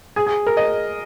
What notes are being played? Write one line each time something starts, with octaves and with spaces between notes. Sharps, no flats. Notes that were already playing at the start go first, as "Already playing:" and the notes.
G#4
G#4
A#4
D#5